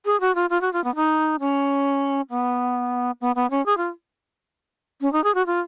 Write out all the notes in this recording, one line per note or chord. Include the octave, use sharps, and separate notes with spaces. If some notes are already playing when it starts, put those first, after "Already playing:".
G#4
F#4
F4
F4
F#4
F4
B3
D#4
C#4
B3
B3
B3
C#4
G#4
F4
C#4
D#4
G#4
F#4
F4